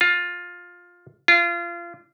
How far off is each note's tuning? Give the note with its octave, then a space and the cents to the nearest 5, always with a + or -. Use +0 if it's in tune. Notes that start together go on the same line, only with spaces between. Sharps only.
F4 +15
F4 -25